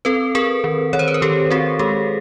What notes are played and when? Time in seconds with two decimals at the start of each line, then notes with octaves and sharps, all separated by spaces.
0.05 C4 A4 B4
0.35 C4 G#4 A#4
0.64 D#3
0.93 D#3 C#5
0.99 C5
1.08 B4
1.14 A#4
1.22 D#3 G4 A4
1.50 C4 F#4 G#4
1.79 G#3 G4 A4